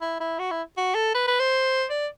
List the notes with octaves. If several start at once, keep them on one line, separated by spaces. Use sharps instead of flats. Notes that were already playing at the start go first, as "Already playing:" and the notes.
E4
E4
F#4
E4
F#4
A4
B4
B4
C5
D5